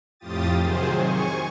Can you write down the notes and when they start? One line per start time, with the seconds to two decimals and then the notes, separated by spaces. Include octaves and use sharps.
0.20 F2 A2 F4 G4 D#6 A6
0.58 C3 D#3 F#3 G#4 C5
0.96 G#5 C#6